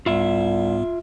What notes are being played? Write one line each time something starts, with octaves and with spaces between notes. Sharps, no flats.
C2 G#2 B3 F4 E5